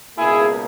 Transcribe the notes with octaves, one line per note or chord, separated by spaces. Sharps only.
C#2 B2 A#3 E4 G#4